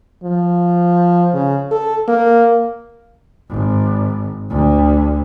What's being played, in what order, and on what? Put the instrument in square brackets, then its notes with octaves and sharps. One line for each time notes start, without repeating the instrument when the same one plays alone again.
[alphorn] F3
C#3
A4
A#3
[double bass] G#1
D2